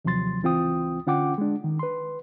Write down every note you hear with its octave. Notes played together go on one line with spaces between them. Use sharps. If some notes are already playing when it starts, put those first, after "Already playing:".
D#2 C3 F3 F#3 C6 A6
C#2 E3 C4 F4 G5 D#6
D3 C#4 F4 F#5 G5 D6
G#3 D4
D#3
B4 C6